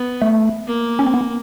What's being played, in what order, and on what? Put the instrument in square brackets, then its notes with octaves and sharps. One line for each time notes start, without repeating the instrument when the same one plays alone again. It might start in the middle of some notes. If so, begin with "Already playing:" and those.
Already playing: [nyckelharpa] B3
[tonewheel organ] A3
[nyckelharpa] A#3
[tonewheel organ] C#4
C4
B3